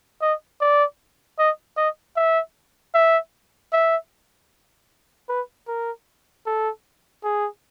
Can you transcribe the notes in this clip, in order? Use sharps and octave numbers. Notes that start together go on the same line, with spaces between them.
D#5
D5
D#5
D#5
E5
E5
E5
B4
A#4
A4
G#4